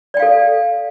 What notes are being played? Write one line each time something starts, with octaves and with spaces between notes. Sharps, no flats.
A4 D5 F5 G5